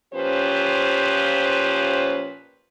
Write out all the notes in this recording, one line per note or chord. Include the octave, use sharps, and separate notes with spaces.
A#2 F3 C#4 G4 B4 C5